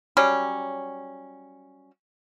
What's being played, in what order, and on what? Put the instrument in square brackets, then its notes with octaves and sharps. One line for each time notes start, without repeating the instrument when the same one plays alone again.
[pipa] F#3 G3 C#4